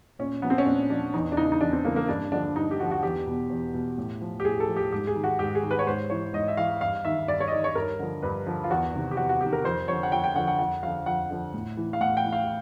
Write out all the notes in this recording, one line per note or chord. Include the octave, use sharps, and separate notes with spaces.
A#2 C#4
F3 B3
C4
C#4
A#2 D4
F3 D4
E2 D#4
D4
C#3 E3 D#4
D#4
E2 D4
C4
C#3 E3 A#3
A#3
G2 D4
D3 F3 D4
G2 D#4
G4
D3 F3 F#4
F#4
E2 G4
B2
E2
B2
A2
F3
G4
A2 G#4
A4
F3
G4
G#2 G4
G#4
D#3
F#4
G#2 G4
G#4
D#3
B4
C#5
G#2 C5
E3 C#5
G#2 D#5
E5
E3 F5
G2 F5
D#3 E5
G2 D5
C#5
D#5
D#3 D5
C#5
G2 A#4
D3 F3
G2 B4
D3 F3
F4
E2 F#4
C3 D#3
G4
E2 F#4
F#4
C3 D#3 G4
A#4
F2 C5
D3 F3 C#5
F#5
F2 G5
G5
D3 F3 F#5
F#5
F2 F#5
D3 F3 F5
F2 F#5
D3 F3
A2
E3
F5
A2 F#5
G5
E3
F5